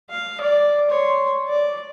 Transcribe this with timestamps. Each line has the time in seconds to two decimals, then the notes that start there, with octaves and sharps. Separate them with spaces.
0.10 F5
0.40 D5
0.90 C#5 C6
1.49 D5